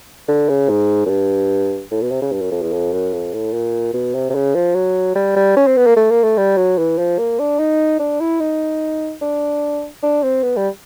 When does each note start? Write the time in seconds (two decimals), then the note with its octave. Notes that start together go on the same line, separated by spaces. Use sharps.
0.28 D3
0.49 C#3
0.69 G#2
1.06 F#2
1.09 G2
1.91 A2
2.02 B2
2.11 C3
2.22 C#3
2.32 G2
2.41 F#2
2.52 F2
2.62 E2
2.72 F2
2.93 F#2
3.13 F2
3.33 A2
3.53 A#2
3.93 B2
4.14 C3
4.30 C3
4.35 C#3
4.55 F3
4.75 F#3
5.15 G3
5.36 G3
5.57 C#4
5.67 C4
5.77 B3
5.86 A#3
5.97 A3
6.11 A#3
6.24 A3
6.37 G3
6.57 F#3
6.78 E3
6.98 F3
7.18 A#3
7.39 D4
7.59 D#4
8.00 D4
8.21 E4
8.40 D#4
9.21 D4
10.03 D4
10.23 C4
10.43 B3
10.57 G3